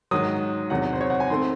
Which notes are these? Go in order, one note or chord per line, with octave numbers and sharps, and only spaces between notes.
G#2 D#3 F#3 D#6
E2 C3 D#3 F#3 F#5
C5
C#5
F#5
G#5
D#3 A3 C4 C6